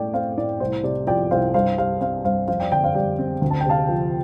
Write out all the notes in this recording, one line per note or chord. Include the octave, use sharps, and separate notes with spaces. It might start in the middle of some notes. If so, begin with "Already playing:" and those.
Already playing: A2 A3 D5 G5
C4 C5 F5
A2 D5
C2 C5
C3 D5
F3 D5 G5
C2 C5 F5
G2 C5 F5
G3 C5 F5
C4 C5 F5
G2 C5 F5
F2 C5 F5
D5 G5
D3 D5 G5
C5 F5
G3 D5 G5
C4
D2
A5
G5
C3 F5 A5
F3